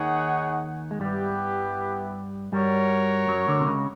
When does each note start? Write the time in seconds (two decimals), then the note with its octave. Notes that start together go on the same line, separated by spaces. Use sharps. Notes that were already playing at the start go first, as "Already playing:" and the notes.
Already playing: D#2 D#3 D#4 G#4 C#5 F#5
0.91 G#3
1.00 G2 G3 B3 E4 G4 B4 E5
2.52 G2 G3 F#4 A#4 C#5
3.28 F#2 F#3
3.48 D2 D3
3.60 C3
3.66 C#2 C#3